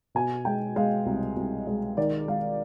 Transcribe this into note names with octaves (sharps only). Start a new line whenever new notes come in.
B2 G#5
G#3 G5
G#3 F5
C2
C2
G#3
D#3 D5
G#3 F5